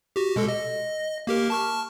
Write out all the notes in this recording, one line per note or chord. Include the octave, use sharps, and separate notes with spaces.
F#4 G4
B2 G#3 A4
D#5
A#3 G4 A#4
A5 C#6 F6